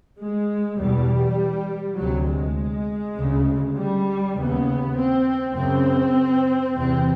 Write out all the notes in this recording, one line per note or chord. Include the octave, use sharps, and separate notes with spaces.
G#3
E2 B2 G3
D2 C3 F#3
G#3
D2 C#3
G3
D#2 C#3 B3
C4
F#2 C#3 C4
E2 C3 C4